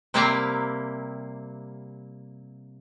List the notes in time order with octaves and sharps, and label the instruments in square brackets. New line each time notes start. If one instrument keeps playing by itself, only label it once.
[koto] C3 G3 A#3 E4 F5 A#5